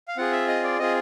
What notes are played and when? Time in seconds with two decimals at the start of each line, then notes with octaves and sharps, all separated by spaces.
0.08 F5
0.17 C4 F4 G#4 F#5
0.32 E5
0.48 D#5
0.64 D5
0.79 C4 F4 G#4 D#5